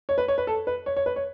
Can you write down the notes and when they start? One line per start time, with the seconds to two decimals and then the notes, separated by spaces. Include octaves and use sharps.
0.09 C#5
0.18 B4
0.28 C#5
0.38 B4
0.47 A4
0.67 B4
0.86 C#5
0.96 C#5
1.06 B4
1.16 C#5